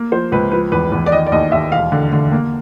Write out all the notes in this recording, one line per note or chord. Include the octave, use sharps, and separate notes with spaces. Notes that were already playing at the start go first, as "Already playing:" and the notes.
Already playing: A#3
F3 C5
C#2 B4
F3 B4
E2 B4
E2
D5
D#3 D#5
D5
D#2 D#5
D#2 E5
E1 F5
D3
D3
A#3